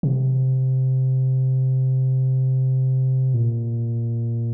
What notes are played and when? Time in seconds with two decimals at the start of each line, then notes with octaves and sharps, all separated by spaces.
0.03 C3
3.34 A#2